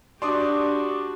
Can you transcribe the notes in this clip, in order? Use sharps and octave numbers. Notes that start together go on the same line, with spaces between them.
D4 F#4 G4 C6 D6 D#6